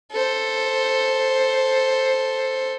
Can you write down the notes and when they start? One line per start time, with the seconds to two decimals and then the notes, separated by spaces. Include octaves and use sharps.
0.12 A4 C5